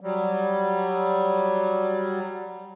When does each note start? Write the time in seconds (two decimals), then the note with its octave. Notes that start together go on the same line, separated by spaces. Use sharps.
0.01 F#3 G3